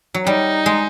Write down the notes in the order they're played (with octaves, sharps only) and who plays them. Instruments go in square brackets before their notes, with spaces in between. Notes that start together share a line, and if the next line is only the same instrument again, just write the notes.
[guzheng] F#3
[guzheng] G3 [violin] D#4
[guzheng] G#3